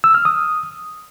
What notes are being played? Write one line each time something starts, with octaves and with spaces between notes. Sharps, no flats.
E6
F6
D#6